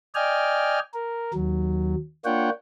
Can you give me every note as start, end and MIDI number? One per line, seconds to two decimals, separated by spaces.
0.15 0.79 74
0.15 0.79 75
0.15 0.79 79
0.15 0.79 80
0.15 0.79 89
0.94 1.32 70
1.34 1.95 39
1.34 1.95 54
2.25 2.50 58
2.25 2.50 62
2.25 2.50 65
2.25 2.50 73
2.25 2.50 78
2.25 2.50 79